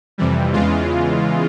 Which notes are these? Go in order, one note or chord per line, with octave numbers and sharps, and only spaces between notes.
F2 C3 E3 G3
E2 C#3 E3 G#3 F4